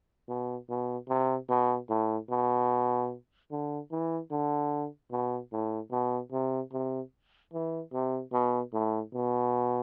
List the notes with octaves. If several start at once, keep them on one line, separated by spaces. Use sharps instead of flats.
B2
B2
C3
B2
A2
B2
D3
E3
D3
B2
A2
B2
C3
C3
E3
C3
B2
A2
B2